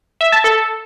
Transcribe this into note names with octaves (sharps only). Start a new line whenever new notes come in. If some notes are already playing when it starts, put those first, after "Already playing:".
E5
A5
A4